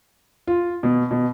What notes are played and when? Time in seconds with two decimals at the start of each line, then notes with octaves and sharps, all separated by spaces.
0.47 F4
0.83 B2
1.11 B2